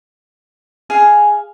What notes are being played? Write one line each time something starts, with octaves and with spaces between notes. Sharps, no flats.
G#4 F5 G#5